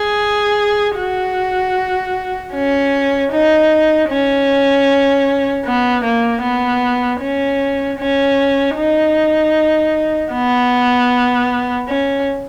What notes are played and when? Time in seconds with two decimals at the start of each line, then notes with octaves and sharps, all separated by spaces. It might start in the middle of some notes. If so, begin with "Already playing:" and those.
Already playing: G#4
0.97 F#4
2.54 C#4
3.32 D#4
4.09 C#4
5.65 B3
6.04 A#3
6.42 B3
7.20 C#4
7.99 C#4
8.76 D#4
10.32 B3
11.88 C#4